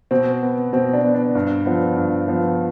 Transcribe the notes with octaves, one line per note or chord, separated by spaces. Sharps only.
B2 C4
B3
B2 C4
D4
B3
D4
G2
F3 B3
G2
F3 B3